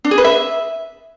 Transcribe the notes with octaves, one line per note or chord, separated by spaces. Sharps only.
D4
G#4
B4
E5